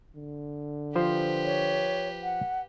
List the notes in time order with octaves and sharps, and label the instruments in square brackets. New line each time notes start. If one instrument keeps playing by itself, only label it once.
[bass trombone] D3
[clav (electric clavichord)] F3 C5 [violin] G4 B4
[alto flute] C#5
F#5